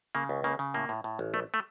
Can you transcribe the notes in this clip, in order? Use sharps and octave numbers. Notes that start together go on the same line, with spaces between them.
C#3 A#3
C#2
C#3 A#3
C#3
A2 A#3
A2
A2
A1
A#1 A3
A3